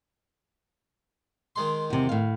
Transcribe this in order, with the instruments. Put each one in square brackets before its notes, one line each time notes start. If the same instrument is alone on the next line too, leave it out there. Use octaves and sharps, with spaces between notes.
[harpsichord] D#3 G#3 C6
[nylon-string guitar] E2 C3
A2 F5